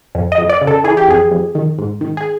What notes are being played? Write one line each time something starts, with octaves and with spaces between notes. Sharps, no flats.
F2
D#5
F2
D5
C#3
A4
E3 G#4
G4
F2 G#4
F2
D#3
G#2
D#3
G#4